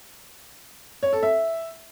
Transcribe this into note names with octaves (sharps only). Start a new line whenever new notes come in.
C#5
A4
E5